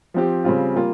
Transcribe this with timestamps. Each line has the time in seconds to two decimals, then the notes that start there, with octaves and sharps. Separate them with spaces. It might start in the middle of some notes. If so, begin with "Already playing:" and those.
0.14 F3 C4 G4
0.44 C#3 G3 C4 F4
0.76 G3 A#3 F4